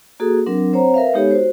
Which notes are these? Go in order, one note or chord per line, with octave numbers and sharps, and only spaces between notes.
A#3 F#4 G#4 A4 D#6
F#3 C4 D4 A#4 F#5
C4 C5 C#5 F#5 A#5
A#4 B4 E5 F5
G#3 B3 D#4 G4 A4 C#5
F#4 C5